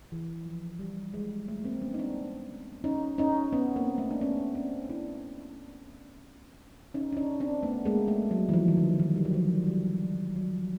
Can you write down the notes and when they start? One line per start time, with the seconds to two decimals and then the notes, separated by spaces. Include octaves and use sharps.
0.12 E3
0.45 F3
0.79 G3
1.14 G#3
1.48 A3
1.65 A#3 C4
1.82 B3 C#4
1.94 D#4
1.99 C4 D4
2.84 C#4 D#4
3.18 C#4 D#4
3.53 B3 C#4
3.76 A#3 C4
3.98 A3
4.11 D4
4.21 B3 C#4
4.55 C4 D4
4.89 D4 E4
6.94 C#4 D#4
7.13 D4
7.17 C#4 D#4
7.40 C4 D4
7.63 A3 B3
7.86 G#3 A#3
8.08 A3
8.31 F#3
8.49 E3
8.53 F3
8.68 D#3
8.77 D3
8.99 D#3
9.16 G3
9.25 F#3
9.34 F3
9.67 G3
10.36 F#3
10.53 F3